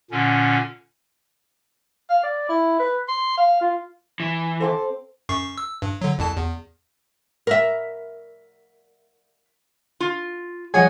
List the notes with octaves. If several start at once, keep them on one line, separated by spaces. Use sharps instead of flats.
A#2 D3 C#4
F5
D5
E4
B4
C6
F5
F4
E3
C4 A4 C6 D6
F#2 C#6 C7
E6
G2
D3 F#3
C2 F2 A5
E2
A#4 E5
F4
F3 G3 G#4 C#5 D#5 F#5 G#5